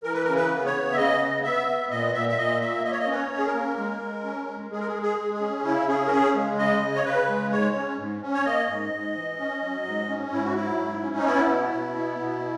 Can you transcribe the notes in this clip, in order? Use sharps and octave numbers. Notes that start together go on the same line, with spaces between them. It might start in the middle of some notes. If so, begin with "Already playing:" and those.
E3 A#4
B4
C#3 A#4
B4
B3
C#5
C#3
E5
C#3 D#5
B3
B3 E5
B3
A#2 D#5
A#2 E5
E5
A#2 D#5
A#3 E5
A#3 D#5
C#5
D#5
C#4 B4
C#5
C#4
G#4
A#4
A#3
G#3
G#3
C#4
G#3
G#3 G#4
A#4
G#4
G#3
G#4
G#3
G#4
C#4
C#3 E4
C#4 G#4
A#4
C#3 G#4
G#3
C#3 D#5
C#3
C#5
C#3 B4
G#3
G#2 C#5
C#4
G#2
C#4
C#5
A#3 D#5
G#2
G#2
E3
C#4
F#3
G#2
C#4
G#2 E4
F#4
F#3 E4
G#2
C#4
D#4
B3 E4
B2
B2
B3
B2